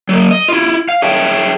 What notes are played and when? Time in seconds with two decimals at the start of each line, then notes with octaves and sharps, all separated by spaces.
0.09 F#3 A#3
0.31 D#5
0.48 E4 F4
0.89 F5
1.02 G#4 C#5 E5 G5 A5